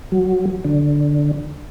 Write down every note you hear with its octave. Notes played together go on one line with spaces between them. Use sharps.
F#3
D3